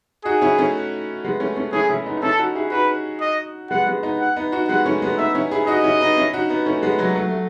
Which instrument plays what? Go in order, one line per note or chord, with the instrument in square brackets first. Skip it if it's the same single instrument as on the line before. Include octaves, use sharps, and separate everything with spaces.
[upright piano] D#4 F#4 [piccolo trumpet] G#4
[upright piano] C#4 E4
A3 C#4
G#3 B3
A3 C#4
A3 C#4
[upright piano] C#4 E4 [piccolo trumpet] G#4
[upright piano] C#4 E4
B3 D#4
D#4
[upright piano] C#4 E4 [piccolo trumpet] A4
[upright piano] D#4 F#4
E4 G#4
[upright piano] D#4 F#4 [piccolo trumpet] B4
[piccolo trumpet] D#5
[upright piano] G#3 B3 [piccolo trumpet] F#5
[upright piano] G#3 B3
B3 D#4
[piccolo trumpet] F#5
[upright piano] B3 D#4
D#4 F#4
[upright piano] G#3 B3 [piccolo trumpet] F#5
[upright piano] A3 C#4
G#3 B3
[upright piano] B3 D#4 [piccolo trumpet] E5
[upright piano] C#4 E4
E4 G#4
[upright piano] D#4 F#4 [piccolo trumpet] D#5
[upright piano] C#4 E4
B3 D#4
C#4 E4
D#4 F#4
B3 D#4
A3 C#4
G#3 B3
F#3 A3
F#3 A3
A3